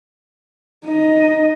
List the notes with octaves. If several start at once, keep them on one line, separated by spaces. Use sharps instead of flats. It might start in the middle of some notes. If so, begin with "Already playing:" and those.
D#4 D#5